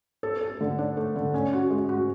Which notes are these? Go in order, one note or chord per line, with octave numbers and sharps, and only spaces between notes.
A4
A4
D3
D4
A3
D3
C#4
F#4
G#3
F#4